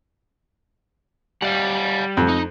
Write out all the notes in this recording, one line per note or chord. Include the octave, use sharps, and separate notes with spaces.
G3 D5 F5 F#5
F2
D#4